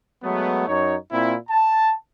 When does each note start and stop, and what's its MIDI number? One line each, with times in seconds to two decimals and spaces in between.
0.23 0.65 54
0.23 0.65 56
0.23 0.65 57
0.23 0.65 59
0.67 0.94 42
0.67 0.94 63
0.67 0.94 73
1.11 1.34 46
1.11 1.34 60
1.11 1.34 64
1.49 1.93 81